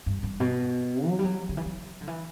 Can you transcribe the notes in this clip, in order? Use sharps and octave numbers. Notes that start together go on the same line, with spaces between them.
G2
G2
B2
F#3
G3
F#3
D3
E3
F#3
D3
E3